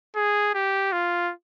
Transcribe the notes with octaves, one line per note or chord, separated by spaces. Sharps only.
G#4
G4
F4